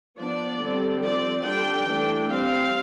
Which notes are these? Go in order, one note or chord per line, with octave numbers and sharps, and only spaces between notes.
F3 B3 D4 D5
D3 G3 C4
F3 C4 D5
D3 G3 D4 G5
E3 A3 D4
G3 C4 F5